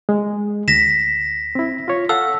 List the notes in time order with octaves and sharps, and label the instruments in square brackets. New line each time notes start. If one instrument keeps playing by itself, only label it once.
[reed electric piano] G#3
[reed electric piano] D2 [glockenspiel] A#6 B6 E7
[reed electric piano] C4 E4
F4 C#5
[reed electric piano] A4 F5 F#5 [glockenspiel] E6